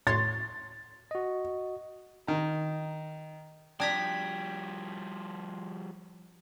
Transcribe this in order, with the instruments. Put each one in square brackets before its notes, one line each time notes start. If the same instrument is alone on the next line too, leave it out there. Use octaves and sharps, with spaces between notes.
[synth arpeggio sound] A2 C#5 C6 [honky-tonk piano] A6
[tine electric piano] F#4 D#5
[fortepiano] D#3 A#5
[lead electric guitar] F3 G3 [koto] D4 A#5 [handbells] G5 G#6 B6